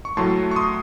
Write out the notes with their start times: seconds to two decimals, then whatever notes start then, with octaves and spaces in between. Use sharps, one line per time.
0.05 C#6
0.17 A2 F#3 A3 A5 C6
0.51 C#6
0.56 C6 D#6